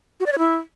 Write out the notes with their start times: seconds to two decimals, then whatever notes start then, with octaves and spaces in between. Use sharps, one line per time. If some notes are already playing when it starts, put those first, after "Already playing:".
0.20 F#4
0.26 D5
0.32 C#5
0.39 E4